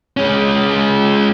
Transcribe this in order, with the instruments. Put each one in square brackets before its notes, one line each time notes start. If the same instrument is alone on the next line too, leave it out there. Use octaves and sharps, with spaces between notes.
[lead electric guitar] G#3 C#4